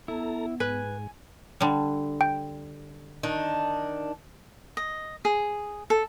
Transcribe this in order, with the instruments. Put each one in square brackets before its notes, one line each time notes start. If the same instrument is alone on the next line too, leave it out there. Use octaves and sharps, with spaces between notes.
[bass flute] B3 [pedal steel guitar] E4 [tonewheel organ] A4 A#5
[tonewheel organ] G#2 [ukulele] B4 [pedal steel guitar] G#5
[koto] D3 G3
[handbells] G5
[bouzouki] D#3 D4
[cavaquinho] D#5
G#4
A4